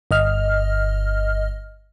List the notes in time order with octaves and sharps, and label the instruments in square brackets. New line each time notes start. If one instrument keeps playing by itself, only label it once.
[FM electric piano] G1 D#5 F6